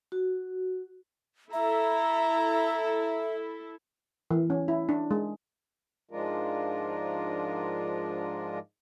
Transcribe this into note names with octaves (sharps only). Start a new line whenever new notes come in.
F#4
E4 A4 E5 A#5
E3
C#4
E4
D4
G#3
G#2 F3 G#3 D4 F4 A#4